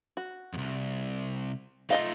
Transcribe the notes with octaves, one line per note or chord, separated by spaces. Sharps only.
F#4
C2 F2
A3 D#4 F4 D#5 F5